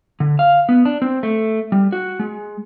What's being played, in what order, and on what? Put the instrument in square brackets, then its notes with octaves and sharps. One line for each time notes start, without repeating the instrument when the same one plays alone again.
[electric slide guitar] D3
F5
B3
D4
C4
A3
G3
F#4
G#3